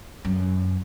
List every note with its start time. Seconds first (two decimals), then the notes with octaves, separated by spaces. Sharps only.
0.25 F#2